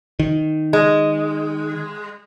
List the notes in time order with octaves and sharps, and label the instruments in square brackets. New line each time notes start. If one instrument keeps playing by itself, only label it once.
[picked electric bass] D#3
[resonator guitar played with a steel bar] G#3